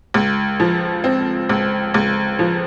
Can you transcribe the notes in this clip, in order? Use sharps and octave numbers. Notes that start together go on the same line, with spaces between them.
C#2
F3
C4
C#2
C#2
F3